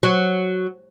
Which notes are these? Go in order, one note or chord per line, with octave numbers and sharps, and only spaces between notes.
F#3